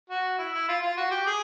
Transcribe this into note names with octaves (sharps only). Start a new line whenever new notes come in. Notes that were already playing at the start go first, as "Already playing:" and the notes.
F#4
E4
E4
F4
F4
F#4
G4
G#4